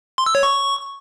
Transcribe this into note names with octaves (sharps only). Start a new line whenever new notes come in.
C6
E6
C#5
C#6